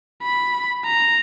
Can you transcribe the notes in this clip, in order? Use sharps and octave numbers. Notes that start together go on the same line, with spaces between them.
B5
A#5